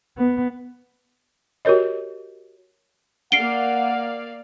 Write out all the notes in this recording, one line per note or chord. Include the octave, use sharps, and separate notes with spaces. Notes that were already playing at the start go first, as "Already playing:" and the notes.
B3
F#4 G4 A#4 C#5 D#5
A#3 D5 F5 F#5 C7 D7 G7